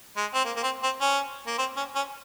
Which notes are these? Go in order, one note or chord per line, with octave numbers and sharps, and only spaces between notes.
G#3
C4
A#3
A#3
C4
C4
C#4
A#3
C4
C#4
C#4